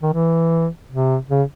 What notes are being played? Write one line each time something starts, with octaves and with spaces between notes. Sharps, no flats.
D#3
E3
C3
C#3